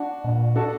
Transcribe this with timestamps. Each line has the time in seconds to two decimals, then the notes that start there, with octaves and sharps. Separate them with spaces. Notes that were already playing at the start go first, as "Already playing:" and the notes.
Already playing: D4 F#4
0.24 A#2
0.56 D4 F#4 A4